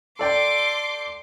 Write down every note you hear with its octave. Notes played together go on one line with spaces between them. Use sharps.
A4 D5 G5 C6 D6